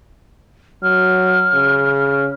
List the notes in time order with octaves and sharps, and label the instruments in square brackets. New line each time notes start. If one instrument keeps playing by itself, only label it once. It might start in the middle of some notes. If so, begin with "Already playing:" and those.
[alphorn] F#3 [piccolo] F6
[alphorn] C#3